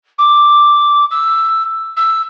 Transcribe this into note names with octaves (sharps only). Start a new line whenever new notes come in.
D6
E6
E6